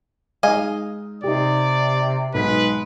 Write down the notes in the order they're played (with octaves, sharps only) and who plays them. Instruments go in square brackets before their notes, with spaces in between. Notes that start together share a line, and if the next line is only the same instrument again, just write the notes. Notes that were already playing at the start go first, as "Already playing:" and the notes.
[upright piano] G#3 D#4 [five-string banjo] D#5 F5 G#5
[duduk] C3 [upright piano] D#4 G4 [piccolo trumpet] D5
[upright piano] B1 G#2 B6 [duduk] G#3 [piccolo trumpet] B4